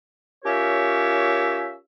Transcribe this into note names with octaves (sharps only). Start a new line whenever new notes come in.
C#4 F4 G4 A#4 C#5 E5